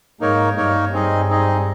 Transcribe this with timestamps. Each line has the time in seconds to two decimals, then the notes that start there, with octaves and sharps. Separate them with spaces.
0.20 G#2 A#3 D#4 A#4 C#5
0.56 G2 A#3 D#4 A#4 C#5
0.92 G2 C4 D#4 G#4 D#5
1.29 C4 D#4 G#4 D#5